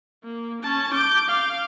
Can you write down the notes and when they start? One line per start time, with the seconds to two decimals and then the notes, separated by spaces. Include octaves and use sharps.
0.24 A#3
0.63 C#4 A5
0.94 D6 G6
1.28 F5